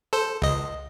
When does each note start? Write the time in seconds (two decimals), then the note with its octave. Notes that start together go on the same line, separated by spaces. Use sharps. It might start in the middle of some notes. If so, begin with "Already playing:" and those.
0.13 A4 C5
0.42 C#2 D#5